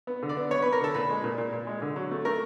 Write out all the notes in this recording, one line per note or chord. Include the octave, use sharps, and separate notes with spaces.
B3
D3
D5
B3
B3 C#5
B4
B3
A#4
D3 A4
A#2 B4
G#3
A#2
A#2
A#2
G#3
D3
F#3
A3
A3 A#4